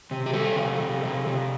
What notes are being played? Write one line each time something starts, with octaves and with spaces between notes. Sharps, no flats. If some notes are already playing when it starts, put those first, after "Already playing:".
C3
G4
G3 A4
C3
C3
C3
C3